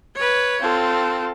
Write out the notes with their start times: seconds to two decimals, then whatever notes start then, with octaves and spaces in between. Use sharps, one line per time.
0.16 B4 C#5
0.61 C4 F4 A4